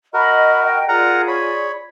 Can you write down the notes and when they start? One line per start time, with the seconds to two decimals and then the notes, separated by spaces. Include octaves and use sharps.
0.14 F#4 A#4 D#5 B5
0.65 D#5 G5
0.89 F4 G#4 A#4 D5 F#5 A#5
1.28 C#5 B5